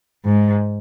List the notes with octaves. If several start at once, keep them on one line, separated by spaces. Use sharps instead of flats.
G#2